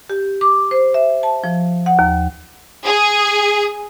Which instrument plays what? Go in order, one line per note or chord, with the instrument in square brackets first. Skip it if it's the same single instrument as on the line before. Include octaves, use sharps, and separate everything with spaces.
[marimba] G4
D6
C5
E5
A5
F3
F#5
D#2
[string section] G#4